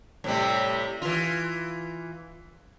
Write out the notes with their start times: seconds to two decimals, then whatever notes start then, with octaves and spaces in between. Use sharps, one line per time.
0.24 A2 C3 G3
1.02 E3 F4